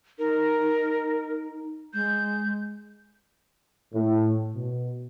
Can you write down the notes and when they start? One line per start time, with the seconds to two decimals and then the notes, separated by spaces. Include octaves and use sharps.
0.19 D#4 A#4
1.94 G#3 G6
3.94 A2
4.55 B2